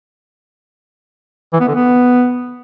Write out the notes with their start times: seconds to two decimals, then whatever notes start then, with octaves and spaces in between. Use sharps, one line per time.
1.53 E3
1.61 B3
1.68 D3
1.75 B3